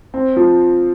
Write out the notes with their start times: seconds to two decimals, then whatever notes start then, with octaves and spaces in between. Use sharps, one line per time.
0.14 C4
0.36 F3